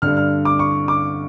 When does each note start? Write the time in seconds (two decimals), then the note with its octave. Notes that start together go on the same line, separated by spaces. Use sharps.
0.02 G2 D3 F6
0.17 F6
0.45 D6
0.59 C#6
0.88 D6